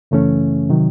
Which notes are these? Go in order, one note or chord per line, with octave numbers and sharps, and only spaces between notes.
F#2 C#3 E3 A3 C#4
C3 D#3 F#3